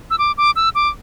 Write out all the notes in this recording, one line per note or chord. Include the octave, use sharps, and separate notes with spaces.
E6
D6
D6
E6
D6